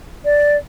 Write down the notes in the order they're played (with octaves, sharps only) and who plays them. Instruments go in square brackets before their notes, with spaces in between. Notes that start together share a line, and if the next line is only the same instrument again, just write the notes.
[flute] D5